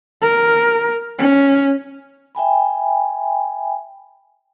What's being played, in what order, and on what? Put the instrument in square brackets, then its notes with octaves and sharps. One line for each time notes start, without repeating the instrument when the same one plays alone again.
[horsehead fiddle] A#4
C#4
[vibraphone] E5 G5 G#5 B5